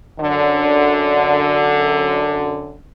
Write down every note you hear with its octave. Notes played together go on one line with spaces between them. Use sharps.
F#2 D3